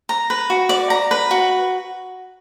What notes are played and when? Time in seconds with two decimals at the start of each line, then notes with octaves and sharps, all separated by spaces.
0.09 A#5
0.30 B4
0.50 F#4
0.69 D5
0.90 A#5
1.11 B4
1.31 F#4